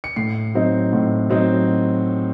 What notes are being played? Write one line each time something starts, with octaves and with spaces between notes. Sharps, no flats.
C#7
A2 C7
F#3 C4 D#4
A2
F#3 C4 D#4